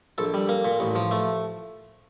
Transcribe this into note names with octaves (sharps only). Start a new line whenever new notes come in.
A#1 A4
G3
A#3
A#2
A1
F3
A3